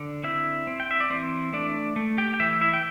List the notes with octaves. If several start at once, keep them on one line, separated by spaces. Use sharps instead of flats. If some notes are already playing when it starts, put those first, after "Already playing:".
Already playing: D3
C4 E4 E5
C4
G5
E5
D5
E3 C4 C5
A3 D4 D5
A3
G4 G5
G5
E3 E4 E5
E4 E5
G5